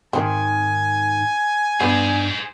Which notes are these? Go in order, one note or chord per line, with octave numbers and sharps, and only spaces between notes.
G#2 D#3 C4 G#5
G2 B3 G#4 C5